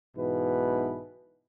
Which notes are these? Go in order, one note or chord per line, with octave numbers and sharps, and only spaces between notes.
B1 G#2 B2 E3 B4